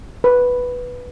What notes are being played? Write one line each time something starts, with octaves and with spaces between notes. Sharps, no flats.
B4